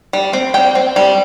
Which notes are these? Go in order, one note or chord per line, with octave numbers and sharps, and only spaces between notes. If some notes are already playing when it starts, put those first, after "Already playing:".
G3
C4
G3 G5
C4
G3